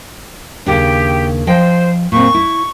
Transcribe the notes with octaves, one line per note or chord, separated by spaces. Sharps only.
D#2 C#3 D4 G4
F3 C5 D#5 G5
A#2 C4 C#6
E4